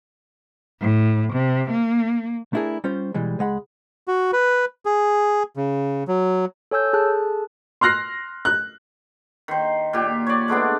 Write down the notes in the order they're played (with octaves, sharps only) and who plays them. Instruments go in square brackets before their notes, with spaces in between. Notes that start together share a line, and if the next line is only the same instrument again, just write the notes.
[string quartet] A2
C3
A#3
[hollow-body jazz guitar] A3 D4 E4 G4 G#4 A#4
G3 C#4 F4 C5
B2 E3 G3 G#3
C#2 G#3 F#5 B5
[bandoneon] F#4
B4
G#4
C#3
F#3
[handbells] A4 C#5 G#5 E6 G6
G#4 A4 A5 F#6
[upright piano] C6 F6 F#6 A#6 C7
F#6
[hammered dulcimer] D#3 C5
A#2 G4
C#5 D5
G#3 A3 B3 D4